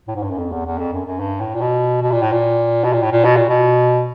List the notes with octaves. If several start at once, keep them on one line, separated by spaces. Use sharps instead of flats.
A2
G#2
G2
F#2
F2
E2
E2
F2
F#2
F#2
G2
A2
A#2
B2
B2
A#2
A2
A#2
B2
A#2
A2
A#2
B2
A#2
B2